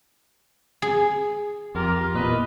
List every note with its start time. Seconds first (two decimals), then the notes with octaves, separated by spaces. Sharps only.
0.82 G#4
1.75 F2 F4 G4 A#4
2.14 E2 A#2 B4 D#5